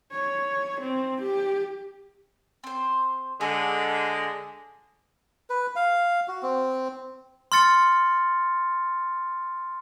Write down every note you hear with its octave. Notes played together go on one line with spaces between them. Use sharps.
C#5
C4
G4
C4 C5
D3 G#3 G#4
B4
F5
F#4
C4
C6 F6 A6 C#7